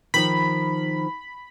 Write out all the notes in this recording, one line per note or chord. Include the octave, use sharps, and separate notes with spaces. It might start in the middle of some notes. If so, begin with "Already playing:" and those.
D#3 F3 B5